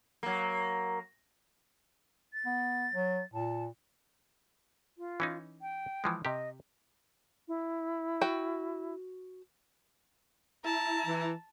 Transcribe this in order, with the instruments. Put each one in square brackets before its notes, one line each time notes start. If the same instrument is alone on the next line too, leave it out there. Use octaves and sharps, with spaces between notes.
[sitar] F#3 A#3
[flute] A6
[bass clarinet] B3
F#3
[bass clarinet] A#2 [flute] A5
[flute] F4
[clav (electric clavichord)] E3 C#4 D#4
[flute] G5
[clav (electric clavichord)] E3 F3 G#3
[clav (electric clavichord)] C3 G4 [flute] D#5
[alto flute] E4
[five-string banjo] F#4 G5
[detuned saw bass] E4 [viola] A5 [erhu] A#5
[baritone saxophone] E3